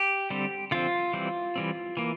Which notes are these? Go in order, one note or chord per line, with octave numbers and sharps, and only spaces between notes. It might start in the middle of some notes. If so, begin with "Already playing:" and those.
Already playing: G4
D3 G3 C4
D3 F3 C4 F4
E3 G3 C4
E3 G3 C4
E3 A#3